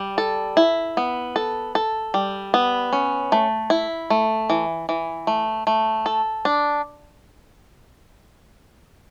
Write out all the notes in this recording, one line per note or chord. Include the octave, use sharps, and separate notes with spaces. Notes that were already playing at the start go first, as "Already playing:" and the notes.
Already playing: G3
A4
E4
B3
A4
A4
G3
B3
C#4
A3
E4
A3
E3
E3
A3
A3
A4
D4